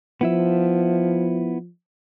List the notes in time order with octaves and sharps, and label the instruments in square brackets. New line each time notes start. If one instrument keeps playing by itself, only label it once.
[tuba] F3 [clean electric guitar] B3 E4 E5